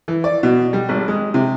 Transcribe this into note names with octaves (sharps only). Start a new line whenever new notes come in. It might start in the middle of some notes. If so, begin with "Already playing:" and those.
E3
D5
B2
G3
G#1
G#3
C3